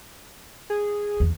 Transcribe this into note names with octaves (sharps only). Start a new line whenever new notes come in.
G#4
E2